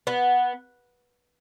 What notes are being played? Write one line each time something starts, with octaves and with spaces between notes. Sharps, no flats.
B3